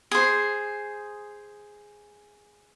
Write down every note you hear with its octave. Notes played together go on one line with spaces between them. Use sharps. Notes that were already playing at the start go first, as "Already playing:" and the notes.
G#4 C5